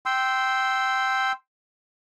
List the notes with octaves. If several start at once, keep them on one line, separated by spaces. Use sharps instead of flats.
G5 C6 E6